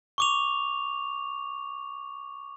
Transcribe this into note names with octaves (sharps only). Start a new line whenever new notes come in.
C#6 D6 F7